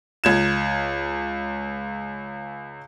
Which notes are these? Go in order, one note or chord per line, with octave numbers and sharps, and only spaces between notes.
C#2 G#6 E7